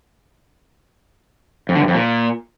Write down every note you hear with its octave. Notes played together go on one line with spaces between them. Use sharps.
F2
D3
G2
F2
A#2